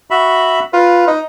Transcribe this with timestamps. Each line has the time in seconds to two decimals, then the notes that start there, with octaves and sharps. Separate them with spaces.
0.11 F#4 E5 B5
0.73 F4 B4
1.07 D#4